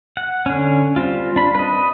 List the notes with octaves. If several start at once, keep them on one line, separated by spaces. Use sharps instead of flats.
F#5
D3 C#4
G3 C4 F4
D4 B5
B4 D#5